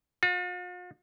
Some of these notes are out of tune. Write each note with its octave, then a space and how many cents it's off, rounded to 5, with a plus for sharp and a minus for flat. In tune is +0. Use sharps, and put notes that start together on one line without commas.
F4 +45